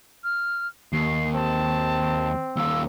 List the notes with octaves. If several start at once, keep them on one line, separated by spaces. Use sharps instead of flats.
F6
D#2 C7
C4 A5
D#2 F4 E6